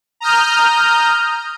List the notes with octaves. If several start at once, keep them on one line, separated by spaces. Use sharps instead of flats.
A#5 D#6 F6 G6